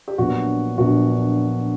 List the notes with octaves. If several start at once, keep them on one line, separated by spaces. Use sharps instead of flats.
G4
A#1 A#2 F#3 B3 D4 F#4
A#1 A#2 F#3 B3 D4 F#4